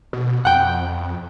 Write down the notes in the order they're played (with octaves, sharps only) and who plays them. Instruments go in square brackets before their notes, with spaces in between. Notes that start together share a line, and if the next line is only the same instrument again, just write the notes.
[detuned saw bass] B2
[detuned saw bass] F2 [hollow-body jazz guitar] F#5 G5